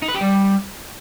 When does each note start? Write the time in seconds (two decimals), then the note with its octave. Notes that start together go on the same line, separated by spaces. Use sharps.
0.02 D#4
0.08 B4
0.15 G4
0.21 G3